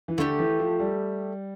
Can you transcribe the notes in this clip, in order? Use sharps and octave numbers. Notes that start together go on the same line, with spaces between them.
E3
D3 A3 E4 G4
E3
F3
G3